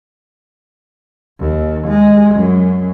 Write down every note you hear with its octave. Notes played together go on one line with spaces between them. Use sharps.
D#2
G#3
F#2